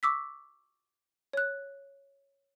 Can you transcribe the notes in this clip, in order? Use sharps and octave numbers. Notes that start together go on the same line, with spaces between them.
C#6 D6 E6 B6
C#5 F#6